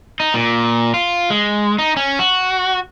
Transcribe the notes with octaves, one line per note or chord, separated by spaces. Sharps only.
D#4
A#2
F4
G#3
D#4
C#4
F#4